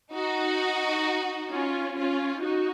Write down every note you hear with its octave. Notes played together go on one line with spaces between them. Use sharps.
D#4 F#4
C#4 F4
C#4 F4
D#4 F#4